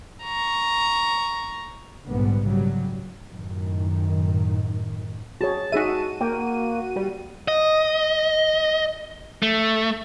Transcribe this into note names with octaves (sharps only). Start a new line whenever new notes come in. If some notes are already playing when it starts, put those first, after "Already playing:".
A#5 C#6
A#1 G#2 B2 D3 G3 B3
C#3 F#3 G3
F#2 A2 D#3
F#4 G#4 C#5 A5
D#4 F#4 G#4 E5 D#7
A#3 G5
G3
D#5
A3